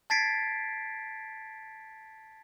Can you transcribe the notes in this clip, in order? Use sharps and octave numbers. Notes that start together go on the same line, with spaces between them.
A5 G#6 A6 B6 C7 D7